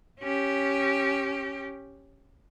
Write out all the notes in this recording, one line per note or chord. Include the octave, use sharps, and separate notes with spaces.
C#4 G4